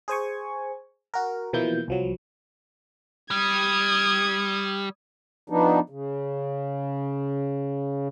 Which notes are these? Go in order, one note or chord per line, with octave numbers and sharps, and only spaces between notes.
G#4 C5 G#5 C#6
F#4 A#4
B2 E3 F3 A#3 E4 G6
C2 F3 F#3
G3 D#6 G#6
F3 B3 D4 D#4
C#3